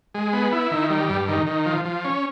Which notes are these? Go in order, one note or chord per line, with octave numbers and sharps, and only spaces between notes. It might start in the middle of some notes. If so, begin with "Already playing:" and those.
G#3
B3
E4
D#3
G3
G2
D#3
D#3
F3
F3
C#4